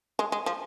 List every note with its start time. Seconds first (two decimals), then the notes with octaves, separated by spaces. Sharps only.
0.19 G#3
0.32 G#3
0.46 F3